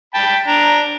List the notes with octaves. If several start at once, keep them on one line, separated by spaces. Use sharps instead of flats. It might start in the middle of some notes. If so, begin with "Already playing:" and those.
G5 A5 B5
D4 A#5